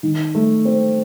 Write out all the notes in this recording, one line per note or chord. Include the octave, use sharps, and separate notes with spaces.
D#3
A3
C4